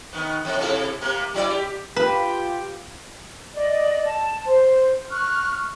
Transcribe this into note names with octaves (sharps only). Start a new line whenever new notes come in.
D#3 B3
F2
C3 E4 A4
C3 A#3
F#3 E4 D5
G4
F4 G4 B4
D5 D#5
A5
C5
C#6 F6 F#6